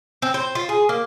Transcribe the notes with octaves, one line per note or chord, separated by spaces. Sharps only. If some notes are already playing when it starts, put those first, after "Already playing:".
C4
C5
F4
G#4
A#3